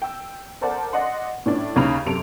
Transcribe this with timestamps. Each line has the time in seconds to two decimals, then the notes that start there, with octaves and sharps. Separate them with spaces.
0.02 G5 E6
0.61 A4 A#4 C5 D5 F#5 A5
0.93 D5 D#5 F#5 C6
1.46 A2 C#4 D4
1.76 D#2 C#3 D#4 A#5 B5 F7
2.06 F#2 C3 A4 C6 D7 F7